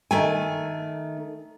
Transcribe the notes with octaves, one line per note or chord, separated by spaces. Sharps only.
D#3 A3 G#5